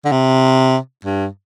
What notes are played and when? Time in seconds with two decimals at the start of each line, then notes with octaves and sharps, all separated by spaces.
0.05 D3
0.12 C3
1.05 G2